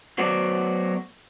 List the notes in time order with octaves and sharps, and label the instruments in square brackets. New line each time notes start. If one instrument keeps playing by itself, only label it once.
[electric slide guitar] F#3 A3 B3 F#4 C5 D5